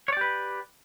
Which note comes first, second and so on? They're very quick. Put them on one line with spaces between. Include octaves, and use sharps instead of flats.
C#5 D5 G4 B4